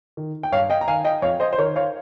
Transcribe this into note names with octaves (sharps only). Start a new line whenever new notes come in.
D#3
G5
G2 C#5 F5
D#5 G5
A#5
D#3 F5 G#5
D#5 G5
F2 C#5 F5
C5 D#5
C5
D#3 A#4 C#5
C#5 F5